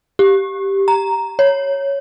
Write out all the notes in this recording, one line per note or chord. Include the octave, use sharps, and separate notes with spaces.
G4
A#5
C#5